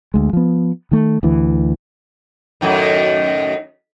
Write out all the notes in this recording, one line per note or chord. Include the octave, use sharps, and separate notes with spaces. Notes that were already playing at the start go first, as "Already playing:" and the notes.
D2 G#3
F3 B3
D#3 A3
D2 E3
F#2 A2 D#3